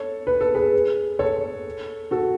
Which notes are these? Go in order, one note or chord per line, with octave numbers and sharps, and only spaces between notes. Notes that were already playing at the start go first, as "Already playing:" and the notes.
Already playing: A4 C#5
B4
A4
G#4 B4
A4 C#5
F#4 A4